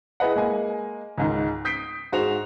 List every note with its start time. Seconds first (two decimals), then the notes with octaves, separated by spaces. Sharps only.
0.20 E4 G#4 B4 D#5 F#5
0.36 G#3 A#3 G#5
1.18 C#2 G#2 D#3
1.65 D#6 G6 B6 C7 D7
2.12 G#2 F#4 G#4 C5 F7